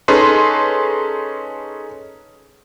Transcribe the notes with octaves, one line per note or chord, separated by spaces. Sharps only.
C#4 D#4 G#4 A4 B4 C6